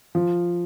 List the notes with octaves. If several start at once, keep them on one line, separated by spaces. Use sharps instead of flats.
F3